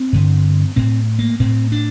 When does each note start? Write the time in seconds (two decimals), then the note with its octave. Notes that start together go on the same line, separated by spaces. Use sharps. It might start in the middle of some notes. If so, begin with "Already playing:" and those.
Already playing: C4
0.13 G2 D3
0.76 A2 C4
1.19 A#3
1.40 A2 C4
1.72 D4